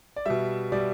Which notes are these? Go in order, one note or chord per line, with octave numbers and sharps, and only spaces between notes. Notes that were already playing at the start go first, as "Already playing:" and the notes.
D5
B2 G3 E5
B2 G3 D5